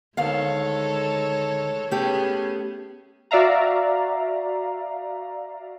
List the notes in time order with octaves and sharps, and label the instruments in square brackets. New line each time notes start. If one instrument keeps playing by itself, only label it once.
[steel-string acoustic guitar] D2 D#3 F5 [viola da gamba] G#3 A4 C#5
[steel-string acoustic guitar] A3 G4 [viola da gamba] B3 C#4 G#4
[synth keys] F#4 D5 E5 F5 A#5